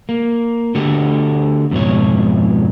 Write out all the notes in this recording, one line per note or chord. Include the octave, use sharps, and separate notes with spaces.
A#3
D3 A3 F#4 G4
F2 G#2 B2 C#5